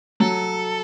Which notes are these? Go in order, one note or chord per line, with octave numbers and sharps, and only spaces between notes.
F#3 A4